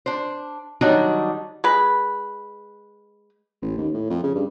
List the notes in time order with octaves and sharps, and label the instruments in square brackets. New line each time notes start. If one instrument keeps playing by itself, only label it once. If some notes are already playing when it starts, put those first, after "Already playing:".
[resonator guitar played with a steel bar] D4 C5
D#3 F#3 G3 D4 D#4
[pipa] G#3 B4
[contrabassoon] A1
D#2
A2
F2
C#3
G2